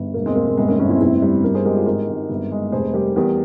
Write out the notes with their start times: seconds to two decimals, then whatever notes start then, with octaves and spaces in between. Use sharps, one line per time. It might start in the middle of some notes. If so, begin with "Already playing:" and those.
Already playing: G1
0.14 E1 A#3
0.26 G#3 C4
0.35 E1 A#3
0.47 A#3
0.57 G1 G#3 C4
0.68 A#3 C#4
0.79 G1 A#3 C#4
0.89 C4 E4
1.00 F1 C4 E4
1.22 G3
1.43 G1 G4 A#4
1.54 G#4 C5
1.64 G#3 G4 A#4
1.75 F4 G#4
1.86 G#1 G4 A#4
2.09 G#1
2.29 G1
2.52 G#3
2.72 F1 G#4 C5
2.94 G3 G4 A#4
3.16 E2 G4 A#4